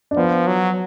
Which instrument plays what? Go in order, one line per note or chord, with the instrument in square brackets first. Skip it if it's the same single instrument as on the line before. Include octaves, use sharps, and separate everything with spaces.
[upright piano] D4
[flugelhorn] F3 [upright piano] B3
[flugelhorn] F#3